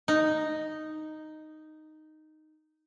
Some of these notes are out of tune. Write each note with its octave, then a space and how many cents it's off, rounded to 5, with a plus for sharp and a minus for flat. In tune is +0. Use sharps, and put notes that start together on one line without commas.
D#4 -5